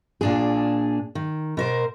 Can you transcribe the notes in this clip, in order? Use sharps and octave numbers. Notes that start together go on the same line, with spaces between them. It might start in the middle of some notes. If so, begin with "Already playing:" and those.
A#2 D4 G#4
D#3
B2 A#4 C5